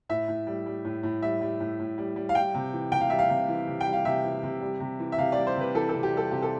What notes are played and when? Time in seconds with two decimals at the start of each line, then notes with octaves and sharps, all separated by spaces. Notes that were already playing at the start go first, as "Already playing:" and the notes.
0.09 A2 E5
0.28 A2
0.47 G3
0.66 G3
0.85 A2
1.03 A2
1.22 G3 E5
1.41 G3
1.60 A2
1.79 A2
1.98 G3
2.16 G3
2.29 F5
2.35 G3 G5
2.54 C3
2.73 E3
2.92 C3 G5
3.00 F5
3.10 G3 E5
3.19 F5
3.30 C3
3.48 E3
3.68 C3
3.81 G5
3.86 G3
3.93 F5
4.05 C3 E5
4.24 E3
4.43 C3
4.62 G3
4.80 C3
4.99 E3
5.12 E5
5.18 C3 F5
5.32 G3 D5
5.47 C5
5.56 C3 B4
5.75 E3 A4
5.89 C3 A4
6.03 G4
6.12 G3 A4
6.31 C3 G4
6.42 A4